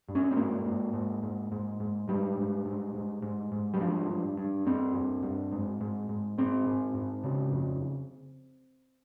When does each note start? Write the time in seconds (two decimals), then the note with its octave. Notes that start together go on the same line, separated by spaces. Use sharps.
0.09 G2
0.15 C#4
0.31 C4
0.36 G#2 A#3
0.65 G#2
0.93 G#2
1.23 G#2
1.52 G#2
1.80 G#2
2.08 G#2 G3
2.37 G#2
2.65 G#2
2.94 G#2
3.23 G#2
3.52 G#2
3.74 G3
3.80 G2 F3
4.09 G2
4.38 G2
4.66 G2 C4
4.94 G2
5.23 G2
5.52 G#2
5.81 G#2
6.09 G#2
6.38 G#2 C4
6.66 G#2
6.95 G#2
7.24 C#3
7.53 F2